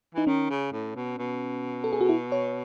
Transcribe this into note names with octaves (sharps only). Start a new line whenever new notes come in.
E3 D#4
D#3 C#4
C#3
A2
B2
B2
A4
G#4
F#4
E4
C#5